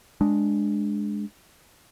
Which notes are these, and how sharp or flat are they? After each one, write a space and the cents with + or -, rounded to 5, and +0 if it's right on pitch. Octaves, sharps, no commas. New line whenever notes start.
G#3 +5 D4 +0